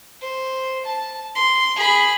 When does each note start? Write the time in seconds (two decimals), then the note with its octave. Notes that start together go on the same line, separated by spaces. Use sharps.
0.21 C5
0.85 A5
1.35 C6
1.76 G#4 B5